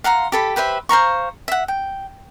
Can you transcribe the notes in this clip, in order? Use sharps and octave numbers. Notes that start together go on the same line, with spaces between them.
F5 F#5 A#5 C6
G4 A4 B5
G4 B4 C5 E5
C5 F5 A#5 C#6
E5 F#5
G5